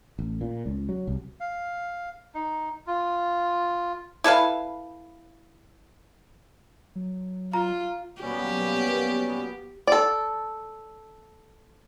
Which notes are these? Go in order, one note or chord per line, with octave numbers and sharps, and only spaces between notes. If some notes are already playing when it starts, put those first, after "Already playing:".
A1
A#2
C#2
F#3
C2
F5
D#4
F4
E4 A4 B4 F5
F#3
F4 A#5
F#3 G3 A#3 B3 C#4 G4
A4 D5